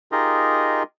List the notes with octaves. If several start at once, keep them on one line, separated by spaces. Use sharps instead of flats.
D#4 F4 G4 G#4 A#4 D#5